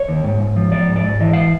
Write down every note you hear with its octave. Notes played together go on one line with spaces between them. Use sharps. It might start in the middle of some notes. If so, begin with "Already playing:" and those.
Already playing: C#5
D#2
G#2
G#2
F3
F3 D5
G#2
D5
G#2
E3 D#5
F5